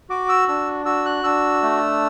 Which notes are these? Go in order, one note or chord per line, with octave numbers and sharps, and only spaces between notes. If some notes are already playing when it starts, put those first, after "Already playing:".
F#4 D6
E6
D4 E6
F#4 E6
F#6
D4 E6
A3